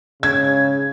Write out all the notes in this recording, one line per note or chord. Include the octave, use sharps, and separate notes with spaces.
G#2 C#3 G#6